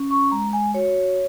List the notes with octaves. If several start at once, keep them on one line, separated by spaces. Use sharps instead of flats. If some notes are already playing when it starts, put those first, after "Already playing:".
Already playing: C#4
C#6
G#3 A#5
G#5
F#4 C#5